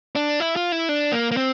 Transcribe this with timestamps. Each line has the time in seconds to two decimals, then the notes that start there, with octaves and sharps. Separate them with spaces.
0.15 D4
0.40 E4
0.56 F4
0.72 E4
0.89 D4
1.13 A#3
1.31 A#3
1.37 C4